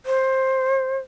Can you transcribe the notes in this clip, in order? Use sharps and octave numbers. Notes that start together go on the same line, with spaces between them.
C5